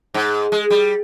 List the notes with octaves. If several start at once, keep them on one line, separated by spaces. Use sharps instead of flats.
G#2
G#3
G3